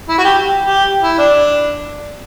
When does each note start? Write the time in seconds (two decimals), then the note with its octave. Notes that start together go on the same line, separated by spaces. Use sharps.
0.08 E4
0.18 F#4
0.24 G4
0.63 G4
1.02 E4
1.18 D4